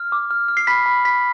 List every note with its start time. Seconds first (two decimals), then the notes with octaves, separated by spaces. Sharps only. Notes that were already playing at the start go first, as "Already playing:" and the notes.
Already playing: F6
0.12 D6
0.31 F6
0.48 F6
0.57 C7
0.67 B5 B6
0.86 B5
1.05 B5 B6